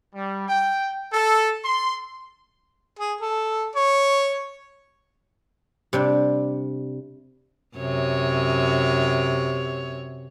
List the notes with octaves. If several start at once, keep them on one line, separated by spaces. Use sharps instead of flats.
G3
G5
A4
C6
G#4
A4
C#5
C3 G3 D4
F#2 C3 C#5